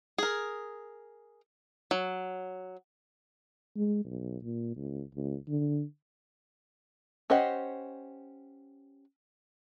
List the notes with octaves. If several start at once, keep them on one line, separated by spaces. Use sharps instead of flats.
G#4 A#4
F#3
G#3
B1
A#2
C#2
C#2
D3
C#4 G4 C5 D#5 F#5